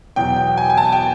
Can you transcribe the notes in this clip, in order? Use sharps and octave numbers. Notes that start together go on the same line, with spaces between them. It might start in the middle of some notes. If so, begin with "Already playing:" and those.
E2 B2 F#3 G5
G5
G#5
G#5
A5
G5